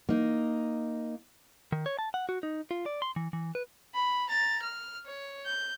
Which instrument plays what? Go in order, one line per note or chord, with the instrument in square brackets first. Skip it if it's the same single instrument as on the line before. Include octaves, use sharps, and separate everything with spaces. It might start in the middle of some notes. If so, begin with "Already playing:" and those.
[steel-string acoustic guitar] A#3 D#4
[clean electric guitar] D#3
C#5
A5
F#5
F#4
D#4
F4
D5
C6
E3
E3
B4
[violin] B5
A#5 A6
F6
C#5
G6